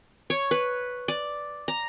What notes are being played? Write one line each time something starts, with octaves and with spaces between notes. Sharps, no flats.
C#5
B4
D5
A#5